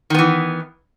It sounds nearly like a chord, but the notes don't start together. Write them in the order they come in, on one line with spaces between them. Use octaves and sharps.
D#3 B3 E3